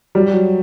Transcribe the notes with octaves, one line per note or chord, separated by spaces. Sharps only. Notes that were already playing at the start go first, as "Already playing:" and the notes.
F#3 G3
F#3